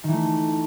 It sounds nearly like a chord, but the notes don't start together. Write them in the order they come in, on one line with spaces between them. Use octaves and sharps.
D#3 E3 A3